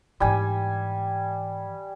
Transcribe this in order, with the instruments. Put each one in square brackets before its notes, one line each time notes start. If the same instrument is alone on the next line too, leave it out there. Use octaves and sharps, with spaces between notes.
[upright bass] G#2 E3 [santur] G3 G#5